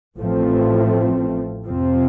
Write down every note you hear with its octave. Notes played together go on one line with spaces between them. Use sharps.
A1 A2 F3 A3 C4
F2 C3 F3 C4